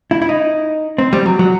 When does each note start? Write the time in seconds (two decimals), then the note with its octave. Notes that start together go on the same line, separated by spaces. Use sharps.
0.11 E4
0.22 E4
0.29 D#4
0.98 C4
1.13 G3
1.26 F#3
1.39 F#3